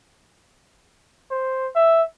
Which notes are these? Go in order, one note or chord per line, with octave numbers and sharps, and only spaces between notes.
C5
E5